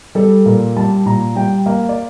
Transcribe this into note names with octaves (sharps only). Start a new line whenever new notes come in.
G3 A4
A#2 A#4
G3 A5
A#2 A#5
G3 G5
A#3 F5
D5